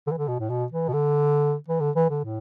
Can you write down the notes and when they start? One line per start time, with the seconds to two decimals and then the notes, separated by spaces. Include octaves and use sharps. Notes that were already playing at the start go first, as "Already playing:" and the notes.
0.07 D3
0.11 E3
0.18 D3
0.28 B2
0.39 A2
0.49 B2
0.72 E3
0.88 B2
0.93 D3
1.68 E3
1.80 D3
1.95 E3
2.10 D3
2.24 A2